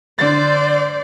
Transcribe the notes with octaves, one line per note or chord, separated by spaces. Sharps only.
D3 C5 D5 A6